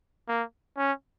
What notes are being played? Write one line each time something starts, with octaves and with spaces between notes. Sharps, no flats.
A#3
C#4